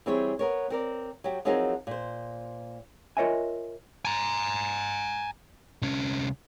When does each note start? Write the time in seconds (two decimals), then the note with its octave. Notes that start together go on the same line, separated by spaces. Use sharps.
0.06 E3 G3 C4 E4 G#4 C#5
0.39 B3 A#4 C#5
0.70 C4 A#4 D5
1.24 F#3 G4
1.45 F3 F#3 C4 D#4 G#4 A#4
1.87 A#2 C5
3.17 F4 A#4 C#5 D#5 E5 G#5
4.05 G#5 A#5
5.82 C2 C#4